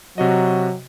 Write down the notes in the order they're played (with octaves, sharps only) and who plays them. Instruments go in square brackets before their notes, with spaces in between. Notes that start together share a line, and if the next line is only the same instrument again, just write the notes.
[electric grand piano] C3 F#4 D#5 [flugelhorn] F#3